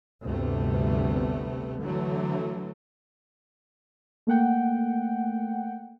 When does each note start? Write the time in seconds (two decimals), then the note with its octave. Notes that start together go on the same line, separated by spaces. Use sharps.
0.24 G1 D2 C3 G3 A3 B3
1.79 D3 E3 F#3 A3
4.27 A3 A#3 F#5 G5